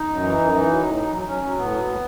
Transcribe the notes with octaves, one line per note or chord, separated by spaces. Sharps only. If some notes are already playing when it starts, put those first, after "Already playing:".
Already playing: D#4
F#2
E3
F#2
E3
F#3
A2
F#3
F#3
F#3 C#4
F#3
A2 B3
F#3
A2